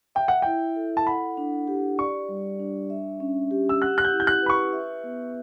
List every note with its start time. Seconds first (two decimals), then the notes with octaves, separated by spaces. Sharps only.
0.15 E5 G5
0.28 F#5
0.42 E4 G5
0.76 A4
0.97 A5
1.07 F#5 B5
1.37 D4
1.68 G4
1.98 D5 C#6
2.29 G3
2.60 D4
2.90 E5
3.20 C#4
3.51 G4
3.69 E6
3.81 F#5 F#6
3.98 F#6
4.05 G6
4.12 E4
4.20 G6
4.27 F#6
4.42 B4 B5
4.50 C#6
4.73 E5
5.04 B3